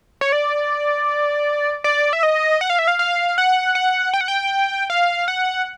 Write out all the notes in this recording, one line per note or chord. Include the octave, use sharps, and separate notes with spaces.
C#5
D5
D5
E5
D#5
F#5
F5
E5
F5
F5
F#5
F#5
G5
F#5
G5
F5
F#5